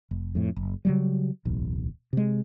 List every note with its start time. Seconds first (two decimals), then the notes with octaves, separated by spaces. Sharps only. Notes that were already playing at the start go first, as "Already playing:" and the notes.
0.11 F1
0.35 F2 A2
0.56 F#1
0.85 C#3 F#3 G3
1.45 D1 B1 E2
2.13 C3 G#3